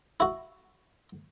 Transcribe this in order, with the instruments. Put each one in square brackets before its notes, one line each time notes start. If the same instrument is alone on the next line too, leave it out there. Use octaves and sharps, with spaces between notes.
[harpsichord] E4 F#4